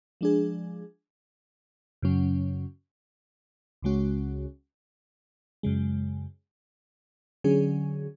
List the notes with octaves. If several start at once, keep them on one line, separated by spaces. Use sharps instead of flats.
F3 G#3 D4 G#4
F#2 C#3 F#3 C#4
C#2 C#3 G#3 C#4 F#4
F#2 C#3 G#3
D3 F#3 C#4 G#4